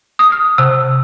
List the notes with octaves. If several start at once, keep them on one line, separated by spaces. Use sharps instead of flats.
D#6
F6
C3